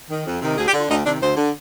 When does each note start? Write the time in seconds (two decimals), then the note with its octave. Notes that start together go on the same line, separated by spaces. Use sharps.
0.09 D#3
0.26 F2
0.41 C3 D#3
0.57 D2 G#4
0.67 G4
0.73 D3
0.78 F4
0.89 D2 D#4
1.05 C3 D#3 D4
1.21 D2 C5
1.36 D3